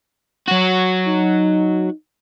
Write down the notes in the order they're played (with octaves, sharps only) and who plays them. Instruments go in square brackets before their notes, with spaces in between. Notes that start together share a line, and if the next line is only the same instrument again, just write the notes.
[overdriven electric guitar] F#3 F#4
[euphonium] D#4